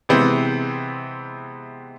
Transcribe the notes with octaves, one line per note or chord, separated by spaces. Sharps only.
C3 E3 G#3 B3 C4